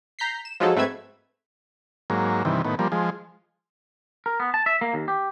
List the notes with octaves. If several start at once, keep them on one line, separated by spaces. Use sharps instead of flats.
A#5 G6 B6 C7
E7
F3 F#3 G#3 D#4 A4
G#2 A3 C4 B4 E5 G#6
G#2 F#3 A#3
G2 C3 D#3 E3
A2 D#3 B3
F3 G3 A#3
F3 G#3
A#4
B3
A5
E5
A#3
D#2
G4